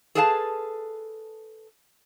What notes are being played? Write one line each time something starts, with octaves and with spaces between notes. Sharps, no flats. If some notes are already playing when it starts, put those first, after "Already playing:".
G#4 A4 B4 F5 F#5 A5